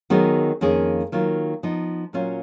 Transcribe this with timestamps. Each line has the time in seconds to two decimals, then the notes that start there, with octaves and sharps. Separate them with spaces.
0.10 D#3 F#3 B3 D#4 G#4
0.61 F2 D#3 A#3 C#4 G#4
1.12 D#3 F#3 A#3 F4
1.63 F3 B3 D#4
2.13 A#2 F#3 C#4 F4